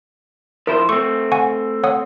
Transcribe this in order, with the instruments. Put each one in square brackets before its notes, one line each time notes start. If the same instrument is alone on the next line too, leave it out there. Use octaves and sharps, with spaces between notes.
[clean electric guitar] F3 E4 C5 [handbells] A#4
[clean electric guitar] A3 C4 [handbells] C#6
[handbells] F#5 G#5 C#6
C#5 F#5 D#6